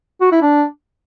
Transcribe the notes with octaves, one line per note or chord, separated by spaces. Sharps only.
F#4
E4
D4